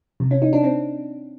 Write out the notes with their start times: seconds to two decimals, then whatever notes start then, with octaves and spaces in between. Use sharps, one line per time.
0.20 C3
0.31 C#4
0.42 D#4
0.53 D4
0.64 C4